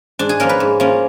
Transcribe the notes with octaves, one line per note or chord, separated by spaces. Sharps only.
G#2 D4
G#4
F3 A#3 C#4 A#4
B4
G#2
F3 A#3 C#4